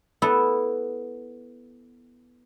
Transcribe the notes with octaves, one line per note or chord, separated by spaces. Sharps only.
B3 E4 A4